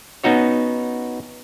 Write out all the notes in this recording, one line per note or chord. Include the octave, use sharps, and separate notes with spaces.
B3 C#4 D#4 F#4 C#5